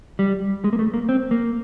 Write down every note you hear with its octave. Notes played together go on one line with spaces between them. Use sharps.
G3
G#3
A#3
A3
A#3
C4
A#3